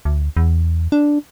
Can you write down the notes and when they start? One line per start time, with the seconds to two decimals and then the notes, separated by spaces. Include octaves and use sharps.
0.05 D2
0.37 E2
0.92 D4